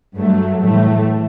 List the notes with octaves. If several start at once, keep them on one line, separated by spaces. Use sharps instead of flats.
G2 F#3 A3
A2 E3 A3